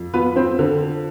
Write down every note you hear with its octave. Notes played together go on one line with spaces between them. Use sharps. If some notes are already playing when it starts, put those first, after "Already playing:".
Already playing: F2
F3 B3 B4
C4 C5
D3